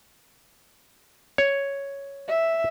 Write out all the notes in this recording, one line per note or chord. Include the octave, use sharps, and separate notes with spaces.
C#5
E5